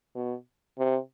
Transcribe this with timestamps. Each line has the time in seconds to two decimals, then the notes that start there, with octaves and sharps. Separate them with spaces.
0.15 B2
0.78 C3